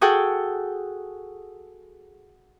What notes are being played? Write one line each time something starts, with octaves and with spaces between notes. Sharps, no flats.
F#4 G#4 A4 F#5 G5